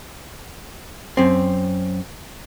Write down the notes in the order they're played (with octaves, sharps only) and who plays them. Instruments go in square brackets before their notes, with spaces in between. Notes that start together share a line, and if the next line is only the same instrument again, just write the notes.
[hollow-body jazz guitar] F#2 C4